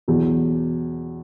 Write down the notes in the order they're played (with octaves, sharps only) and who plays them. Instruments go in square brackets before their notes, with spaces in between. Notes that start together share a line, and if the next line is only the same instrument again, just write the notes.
[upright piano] E2 B2 F#3